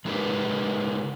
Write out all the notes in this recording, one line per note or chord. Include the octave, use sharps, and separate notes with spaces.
C#3 G#3 D#4 G4 A#4 B4